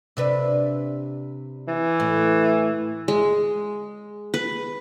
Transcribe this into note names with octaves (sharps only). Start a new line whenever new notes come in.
C3 D4 B4
E3
A2
G#3
B4